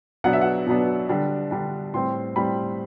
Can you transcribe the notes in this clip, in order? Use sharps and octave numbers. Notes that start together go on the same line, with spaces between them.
B2 F#3 B3 D4 F#5
E5
F#5
B2 F#3 B3 D4
D3 G3 D4
D3 G3 D4
A2 G3 C4 C6
A2 G3 C4 B5